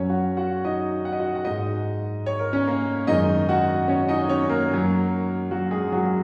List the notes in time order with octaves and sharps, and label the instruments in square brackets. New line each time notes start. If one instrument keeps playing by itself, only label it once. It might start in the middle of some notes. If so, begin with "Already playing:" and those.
Already playing: [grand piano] F#2 F#3 C#4 C#5
F#4 F#5
F#4 F#5
D#4 D#5
F#5
D#5
F#4 F#5
F#5
G#2 G#3 D#4 D#5
C#5
A#4
C#4 C#5
A#3 A#4
F#2 D#3 G#3 D#4 D#5
F#4 F#5
C#4 C#5
D#4 D#5
C#4 C#5
A#3 A#4
F#2 F#3
F#3 F#4
G#3 G#4
F#3 F#4
F#4